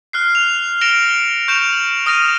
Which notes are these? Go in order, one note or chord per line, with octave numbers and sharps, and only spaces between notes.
F6 F#6 C7
F7
A#6 C#7 D7 E7 F7 G7
C#6 G6 D7 E7 F7
F#7
D#6 F6 A#6 D#7